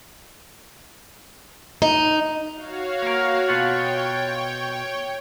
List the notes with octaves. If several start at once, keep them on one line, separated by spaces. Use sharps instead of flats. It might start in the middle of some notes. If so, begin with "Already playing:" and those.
D#4
F#4 C#5 F5
A#3 A#4
B2 F4 C#5 F#5 G5